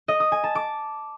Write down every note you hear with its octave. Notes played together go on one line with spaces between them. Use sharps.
D#5
D#6
G#5
A5
D6